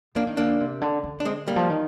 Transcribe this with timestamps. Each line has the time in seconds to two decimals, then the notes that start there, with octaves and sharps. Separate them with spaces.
0.15 F3 A#3 D4
0.27 D#3
0.37 D3 A#3 D4
0.60 C3
0.81 D3
1.03 D3
1.20 D4
1.25 G#3 C4
1.48 G3 A#3
1.56 F3
1.70 D#3